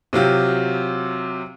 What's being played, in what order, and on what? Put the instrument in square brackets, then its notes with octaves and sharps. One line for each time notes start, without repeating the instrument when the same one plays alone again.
[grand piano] C3 F#3 F4 G4